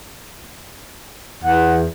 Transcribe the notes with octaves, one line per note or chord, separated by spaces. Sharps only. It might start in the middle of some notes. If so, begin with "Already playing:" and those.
E2 F#5